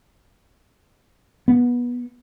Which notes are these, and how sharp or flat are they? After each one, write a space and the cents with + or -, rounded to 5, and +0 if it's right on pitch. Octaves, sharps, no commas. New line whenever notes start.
B3 -20